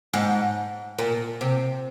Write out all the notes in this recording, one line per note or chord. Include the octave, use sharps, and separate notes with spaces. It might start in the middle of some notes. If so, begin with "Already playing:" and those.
G#2
A#2
C3